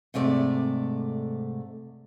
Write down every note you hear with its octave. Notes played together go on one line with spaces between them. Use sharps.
G#2 C3 A3 D5